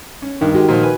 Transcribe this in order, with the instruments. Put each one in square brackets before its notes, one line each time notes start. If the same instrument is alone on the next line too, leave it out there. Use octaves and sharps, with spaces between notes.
[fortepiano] C#4
[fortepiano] G2 [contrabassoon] D#3
[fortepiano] G#3 G4 [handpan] F#4
[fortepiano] A#2 F3
B4 G#5